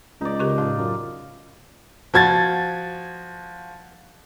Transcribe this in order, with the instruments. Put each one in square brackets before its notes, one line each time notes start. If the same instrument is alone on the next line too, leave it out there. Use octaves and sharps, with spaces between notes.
[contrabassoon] C#2 [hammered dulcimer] D#4 D5
[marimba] C#3 G4 A#4
[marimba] A2 [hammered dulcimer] F4
[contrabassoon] F#2
[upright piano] F3 F#4 G#6 A6